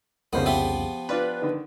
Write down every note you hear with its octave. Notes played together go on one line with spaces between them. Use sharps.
C2 F2 C#3 A#3 B3 D#4 C5
F3 B3 G4 E5
D4 F4 B4 D5
D3 D#3